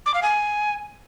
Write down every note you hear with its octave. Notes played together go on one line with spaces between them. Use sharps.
D6
F5
G#5